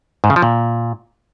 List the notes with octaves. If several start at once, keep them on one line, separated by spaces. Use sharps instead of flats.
G#2
C#3
F3
A#2